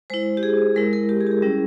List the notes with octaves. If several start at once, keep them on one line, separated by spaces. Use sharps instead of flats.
G#3 E4 C5
G4
G#4
G#3 E4 A#4
A#4
G4
G#4
G4
G#4
G3 C#4 E4